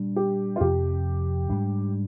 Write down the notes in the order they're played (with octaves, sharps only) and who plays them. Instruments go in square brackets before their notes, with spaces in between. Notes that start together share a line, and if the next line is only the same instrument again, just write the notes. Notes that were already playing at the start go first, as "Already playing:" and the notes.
Already playing: [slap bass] A#2 G3 D4
[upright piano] G4
F4
[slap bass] F2 C3 F3 [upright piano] G4
[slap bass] G#2 G3 D4